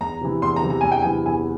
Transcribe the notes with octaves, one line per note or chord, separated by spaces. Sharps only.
E2 A#5
C3 E3
E2 C6
A#5
C3 E3
A#5
E2 G#5
G5
G#5
C3 E3
E2 G#5